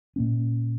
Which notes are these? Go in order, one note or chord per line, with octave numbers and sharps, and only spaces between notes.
A#2 A#3 C#4